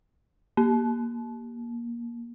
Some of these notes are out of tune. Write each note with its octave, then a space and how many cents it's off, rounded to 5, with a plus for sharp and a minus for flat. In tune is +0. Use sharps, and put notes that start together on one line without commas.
A#3 +20